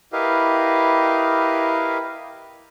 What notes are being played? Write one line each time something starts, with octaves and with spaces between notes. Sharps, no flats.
E4 G4 A#4 B4 D#5 F5